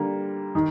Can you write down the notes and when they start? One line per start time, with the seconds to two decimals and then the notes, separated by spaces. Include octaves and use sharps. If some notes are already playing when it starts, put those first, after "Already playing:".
Already playing: D3 G3 A#3
0.55 D#3